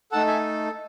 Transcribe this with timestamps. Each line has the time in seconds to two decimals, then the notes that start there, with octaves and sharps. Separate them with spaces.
0.12 A3 D#4 A4 F#5 A5
0.27 E5 G#5